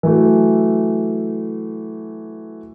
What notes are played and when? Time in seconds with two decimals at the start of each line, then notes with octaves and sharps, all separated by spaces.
0.03 E3 F#3 A3